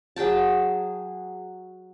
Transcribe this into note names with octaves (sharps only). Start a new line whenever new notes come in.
F#3 G#4 G5 A5